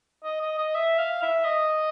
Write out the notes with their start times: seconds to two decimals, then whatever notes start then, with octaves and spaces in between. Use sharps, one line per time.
0.24 D#5
0.41 D#5
0.58 D#5
0.75 E5
0.98 F5
1.22 E5
1.45 D#5